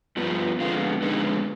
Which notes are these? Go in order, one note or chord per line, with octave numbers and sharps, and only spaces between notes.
G2 F3 B3
F2 D3 G#3 B3 F4
F2 D3 G#3 B3 D#4